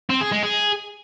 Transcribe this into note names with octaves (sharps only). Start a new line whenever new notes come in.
C4
G#4
G#3
G#4